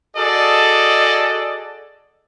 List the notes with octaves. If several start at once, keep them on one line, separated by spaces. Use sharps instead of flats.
F#4 G#4 A4 D5 D#5